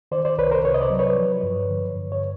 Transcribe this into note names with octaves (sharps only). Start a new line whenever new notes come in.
D#3 C5 D5
C5 D5
C2 B4 C#5
A#4 C5
C3 B4 C#5
D#5
C5 D5
F#3
B4 C#5
F3
G2
D3
G2
C#5